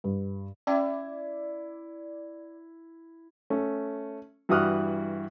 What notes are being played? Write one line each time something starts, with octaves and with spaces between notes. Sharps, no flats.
G2
C#4 E4 D5 G5
A3 C#4
G2 E3 F#4 D#6 F6 F#6